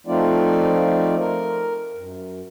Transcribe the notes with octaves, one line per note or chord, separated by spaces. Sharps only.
F3 A3 C4 D#4 F4 D5
A#4
F#2